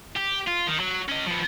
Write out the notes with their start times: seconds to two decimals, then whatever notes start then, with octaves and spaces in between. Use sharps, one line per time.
0.16 G4
0.47 F4
0.67 D#3
0.80 F#3
1.09 C#4 D#5
1.27 F3 B3